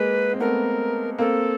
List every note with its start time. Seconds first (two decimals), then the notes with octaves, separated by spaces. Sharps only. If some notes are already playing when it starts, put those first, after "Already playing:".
Already playing: G#3 A#3 B4
0.33 C4
0.40 A3 B3 A#4
1.18 A#3 C4 A4